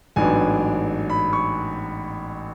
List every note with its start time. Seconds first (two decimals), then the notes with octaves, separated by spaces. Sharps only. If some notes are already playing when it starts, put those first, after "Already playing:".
0.16 A1 G#2 F#3 B3 D4 G#5
1.10 B5
1.33 C#6